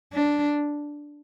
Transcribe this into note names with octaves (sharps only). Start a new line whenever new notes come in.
D4